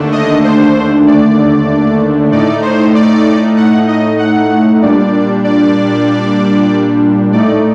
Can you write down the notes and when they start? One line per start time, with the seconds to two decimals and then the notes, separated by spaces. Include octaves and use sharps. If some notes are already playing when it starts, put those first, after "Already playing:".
Already playing: D#2 D3 A3 D4
0.12 D#5
0.44 C5
1.07 D5
2.32 A2 A3 D#4 D5
2.62 C5
2.94 D5
3.57 F#5
3.88 D#5
4.19 F#5
4.82 A#2 G3 D4 D5
5.44 D5
7.31 A2 A3 D#4 D5